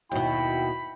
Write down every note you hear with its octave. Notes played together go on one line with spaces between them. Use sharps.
D#2 B2 E4 F#4 G5 B5